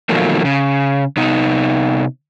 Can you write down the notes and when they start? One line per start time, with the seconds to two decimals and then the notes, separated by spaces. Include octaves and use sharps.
0.09 B2 D#3 F3 F#3 A3 A#3
0.45 C#3
1.17 C3 B3 D#4